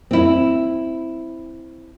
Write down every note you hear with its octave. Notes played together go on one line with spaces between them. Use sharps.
C4 E4